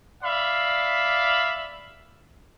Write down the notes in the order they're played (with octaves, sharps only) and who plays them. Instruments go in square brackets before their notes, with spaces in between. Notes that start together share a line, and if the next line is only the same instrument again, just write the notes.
[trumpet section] D5 E5 F5 B5